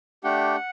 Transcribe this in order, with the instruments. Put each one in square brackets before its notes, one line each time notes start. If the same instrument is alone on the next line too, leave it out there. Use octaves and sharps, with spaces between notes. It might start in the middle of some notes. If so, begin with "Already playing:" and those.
[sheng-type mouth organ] A3 D4 G4 F#5